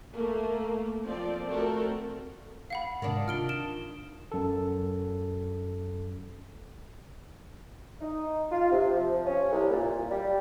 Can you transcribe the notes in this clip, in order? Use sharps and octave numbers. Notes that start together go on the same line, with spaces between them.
A3 A#3
F3 C4 D5
A3 C4 F#4 A4 A#4
F5 F#5 B5
G#2 C3 D#3 D4
F4 A5 F6 D7 G7
D7 E7 G7
F#2 A4
D#4
F4
C3
F3
C#4
C2
A#2
G3